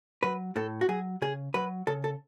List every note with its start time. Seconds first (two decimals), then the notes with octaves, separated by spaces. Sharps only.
0.23 F#3 B4
0.56 A2 A4
0.81 F#4
0.89 F#3 G#4
1.22 C#3 G#4
1.54 F#3 B4
1.87 C#3 A4
2.04 A4